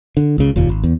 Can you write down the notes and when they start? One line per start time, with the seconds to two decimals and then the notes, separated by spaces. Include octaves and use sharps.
0.17 D3
0.38 C#2 C#3
0.56 F1 D#2 A#2
0.69 G#1
0.84 E2